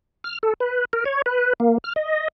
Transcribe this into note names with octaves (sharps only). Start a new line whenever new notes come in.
F6
A4
B4
A#4
C#5
B4
A#3
F6
D#5